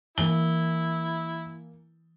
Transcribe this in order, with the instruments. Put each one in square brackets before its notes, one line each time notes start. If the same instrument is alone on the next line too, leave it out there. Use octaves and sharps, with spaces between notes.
[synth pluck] E3 [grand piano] A#3 G#5 [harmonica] E4 [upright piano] G7